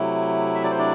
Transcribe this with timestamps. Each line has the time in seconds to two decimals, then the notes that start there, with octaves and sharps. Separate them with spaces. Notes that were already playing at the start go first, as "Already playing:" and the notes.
Already playing: C3 F#3 A3 E4
0.55 E5
0.64 D5
0.71 C5
0.79 D4 D5